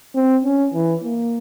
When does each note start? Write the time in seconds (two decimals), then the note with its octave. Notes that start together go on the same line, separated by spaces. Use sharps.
0.15 C4
0.44 C#4
0.74 E3
1.04 A#3